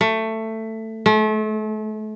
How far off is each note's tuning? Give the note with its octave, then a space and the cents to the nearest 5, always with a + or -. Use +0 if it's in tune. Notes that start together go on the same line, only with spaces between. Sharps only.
A3 +15
A3 -35